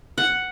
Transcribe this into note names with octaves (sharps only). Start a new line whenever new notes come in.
F#5